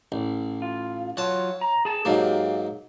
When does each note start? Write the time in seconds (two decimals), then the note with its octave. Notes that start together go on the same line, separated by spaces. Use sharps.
0.12 A1
0.62 F4
1.17 F#3 F4 C#5 A5
1.61 A#5
1.85 G#4 A5
2.05 G#2 F#3 A#3 G4 F5